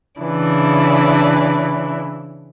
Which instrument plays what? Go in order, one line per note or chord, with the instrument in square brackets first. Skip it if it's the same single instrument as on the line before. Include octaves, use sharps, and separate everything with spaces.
[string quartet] C#3 E3 D4 E4